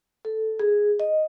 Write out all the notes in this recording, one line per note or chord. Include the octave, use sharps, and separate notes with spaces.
A4
G#4
D#5